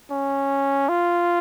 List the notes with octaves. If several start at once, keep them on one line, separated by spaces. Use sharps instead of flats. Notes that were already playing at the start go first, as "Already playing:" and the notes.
C#4
F4